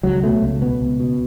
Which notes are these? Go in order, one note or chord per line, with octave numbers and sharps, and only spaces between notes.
C#2 F#3
B2 A3
C#2
B2 B3
C#2
B2